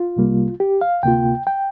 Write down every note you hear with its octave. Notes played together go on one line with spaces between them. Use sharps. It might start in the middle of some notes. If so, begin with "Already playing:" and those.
Already playing: F4
C2 C3 G3 A#3
G4
F5
D2 C3 A#3 F4 G5
G5